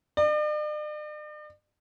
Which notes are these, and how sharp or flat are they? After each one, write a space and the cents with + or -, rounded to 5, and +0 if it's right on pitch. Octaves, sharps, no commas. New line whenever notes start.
D5 +45